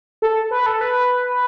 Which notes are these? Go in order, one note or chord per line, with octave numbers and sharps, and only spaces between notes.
A4
B4
A4
B4